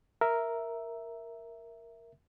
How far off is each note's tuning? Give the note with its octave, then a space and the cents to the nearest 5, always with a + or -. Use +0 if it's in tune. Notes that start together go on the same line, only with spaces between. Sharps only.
A#4 +0 E5 +0